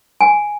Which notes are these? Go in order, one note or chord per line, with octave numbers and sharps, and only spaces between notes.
G#5